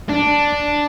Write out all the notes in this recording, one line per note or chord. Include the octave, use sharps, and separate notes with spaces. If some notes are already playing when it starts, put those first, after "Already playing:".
D4